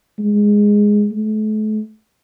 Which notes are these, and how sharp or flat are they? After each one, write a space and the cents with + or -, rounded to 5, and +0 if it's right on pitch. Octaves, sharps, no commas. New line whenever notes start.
G#3 -5
A3 -40